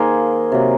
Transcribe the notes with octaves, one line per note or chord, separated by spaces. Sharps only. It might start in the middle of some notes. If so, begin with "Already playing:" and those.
Already playing: D#3 A#3 G#4 C5 F5 G#5
C3 F#3 A#3